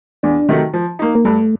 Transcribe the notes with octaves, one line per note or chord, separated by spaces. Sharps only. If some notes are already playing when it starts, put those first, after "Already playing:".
E2 D4
C3 D#3 F#3 A3
F3
A#3 D#4
A#3
G2 A3